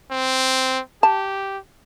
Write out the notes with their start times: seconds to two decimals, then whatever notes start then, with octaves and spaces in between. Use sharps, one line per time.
0.11 C4
1.03 G4 A5